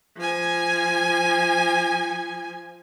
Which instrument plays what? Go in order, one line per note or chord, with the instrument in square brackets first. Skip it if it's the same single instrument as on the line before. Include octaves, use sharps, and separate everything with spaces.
[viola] F3 G#5